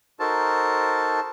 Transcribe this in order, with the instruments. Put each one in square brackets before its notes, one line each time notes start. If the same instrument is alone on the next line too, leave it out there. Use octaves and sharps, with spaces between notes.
[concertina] D#4 F#4 A4 A#4 C5 A5